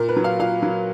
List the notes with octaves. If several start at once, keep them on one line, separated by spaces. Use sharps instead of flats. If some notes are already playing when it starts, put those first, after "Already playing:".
Already playing: A#2 A#4
B4
F#3
F5
A#2 F5
F#3